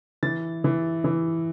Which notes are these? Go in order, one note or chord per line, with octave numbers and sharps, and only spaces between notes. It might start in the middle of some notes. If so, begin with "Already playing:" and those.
E3 A6
E3
E3